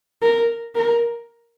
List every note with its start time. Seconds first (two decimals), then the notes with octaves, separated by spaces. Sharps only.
0.22 A#4
0.75 A#4